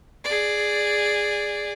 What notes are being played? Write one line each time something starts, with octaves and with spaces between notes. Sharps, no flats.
G#4 D5